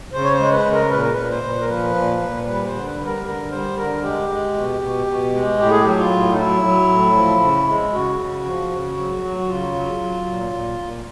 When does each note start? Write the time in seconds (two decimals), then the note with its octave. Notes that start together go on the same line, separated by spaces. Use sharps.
0.13 C#3 C5
0.24 C#5
0.32 C5
0.39 G#3
0.52 B4
0.66 C#3
0.72 A#4
0.91 A#2 B4
1.02 A#4
1.13 A#2 B4
1.30 C5
1.43 A#2
1.60 A#4
1.69 F3 B4
1.95 A#2
2.21 A#2
2.47 G3 B4
2.66 C5
2.73 D3
2.86 B4
3.00 G3
3.06 A#4
3.25 D3 A#4
3.51 G3 C5
3.77 D3 A#4
4.03 G#3 G4
4.29 G#3
4.55 B2
4.81 B2
5.06 B2
5.33 G#3
5.58 A2 G4
5.71 G#4
5.82 F#3 G4
5.98 F4
6.11 A2
6.32 D#4
6.37 F#3 E4
6.62 F#3
6.89 A2
7.15 F3
7.41 C#3
7.67 G#3
7.93 C#3 F#4
8.19 C#3
8.45 F3
8.71 C#3
8.97 F#3
9.23 F#3
9.37 F#4
9.49 C#3 F4
9.74 F#3
10.00 F#3
10.26 A#2
10.53 A#2
10.79 A#2